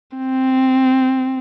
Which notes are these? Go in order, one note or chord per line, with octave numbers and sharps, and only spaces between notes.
C4